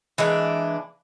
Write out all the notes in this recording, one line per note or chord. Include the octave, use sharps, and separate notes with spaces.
E3 G#3 A#3 D4